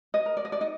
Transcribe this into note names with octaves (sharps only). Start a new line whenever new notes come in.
D#5
A#4
D5
D#5
D5
D#4 D#5